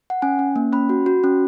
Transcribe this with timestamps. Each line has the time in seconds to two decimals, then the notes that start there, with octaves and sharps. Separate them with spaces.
0.10 F#5
0.22 C#4 G#5
0.39 C#4
0.56 A#3
0.73 C#4 B5
0.89 F#4
1.06 F#4
1.24 C#4